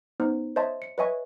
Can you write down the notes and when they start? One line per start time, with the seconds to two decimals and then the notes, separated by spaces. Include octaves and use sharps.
0.20 B3 C#4 D#4 C5
0.56 C5 C#5 D#5 E5 A5 C6
0.82 C#7
0.98 B4 C#5 D#5 E5 G#5 C#6